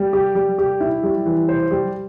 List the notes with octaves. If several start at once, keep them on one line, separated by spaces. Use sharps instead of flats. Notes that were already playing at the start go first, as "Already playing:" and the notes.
Already playing: G3
G4
G3
G4
E4
G3
E3
C5
G3